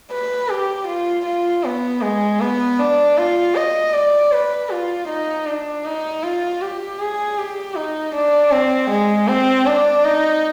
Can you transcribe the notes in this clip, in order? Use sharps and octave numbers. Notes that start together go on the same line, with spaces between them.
B4
G4
F4
F4
B3
G#3
B3
D4
F4
D#5
D5
B4
F4
D#4
D4
D#4
F4
G4
G#4
G4
D#4
D4
C4
G#3
C4
D4
D#4